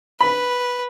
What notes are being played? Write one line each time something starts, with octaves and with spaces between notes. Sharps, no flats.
B4 B5